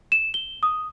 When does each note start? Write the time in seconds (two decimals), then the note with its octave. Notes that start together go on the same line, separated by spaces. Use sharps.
0.12 E7
0.34 G7
0.63 D#6